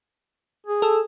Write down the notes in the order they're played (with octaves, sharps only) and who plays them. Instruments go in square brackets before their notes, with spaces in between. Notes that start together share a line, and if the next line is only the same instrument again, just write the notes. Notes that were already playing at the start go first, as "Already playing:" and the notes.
[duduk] G#4
[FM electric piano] A4 E6